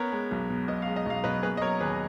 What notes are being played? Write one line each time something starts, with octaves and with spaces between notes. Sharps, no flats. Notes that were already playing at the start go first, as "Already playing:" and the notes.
Already playing: B3 A#4 C#5
G#3
B1
B2
B3 D#5
G#3 F5
D#5
B1 F5
B2 B4 D#5
A#3 G#4 B4
D#5
F#3 A#4 C#5
D#2 G#4 B4